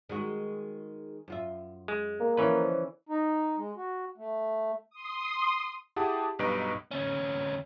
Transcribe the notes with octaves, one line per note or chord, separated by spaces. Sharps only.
D#3 G#3 F#4
F#2 F4 E5
G#3
A#3
D3 E3 F3 C#4 B4
D#4
G#3
F#4
A3
C6 D#6
E4 G4 G#4 F#5 A5 D#6
B1 G2 B4 D#5 A#5 D7
D2 C#4